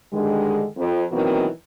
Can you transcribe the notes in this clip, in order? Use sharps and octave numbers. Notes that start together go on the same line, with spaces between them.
G2 D3 D#3 G#3
F2
B2 D#3 E3 F#3 A#3 C4